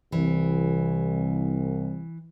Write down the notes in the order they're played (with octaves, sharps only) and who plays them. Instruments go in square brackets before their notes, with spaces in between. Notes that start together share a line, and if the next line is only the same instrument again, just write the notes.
[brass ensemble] C2 [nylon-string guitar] E3